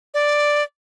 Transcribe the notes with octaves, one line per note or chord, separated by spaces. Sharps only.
D5